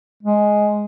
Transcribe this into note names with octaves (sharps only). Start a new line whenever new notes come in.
G#3